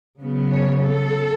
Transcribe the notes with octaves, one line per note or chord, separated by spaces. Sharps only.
C#3 F#3 B3
C#5
A4